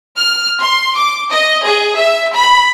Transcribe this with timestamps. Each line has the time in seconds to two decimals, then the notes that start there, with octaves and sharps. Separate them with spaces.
0.15 F6
0.61 C6
0.95 D6
1.31 D#5
1.64 G#4
1.97 E5
2.34 B5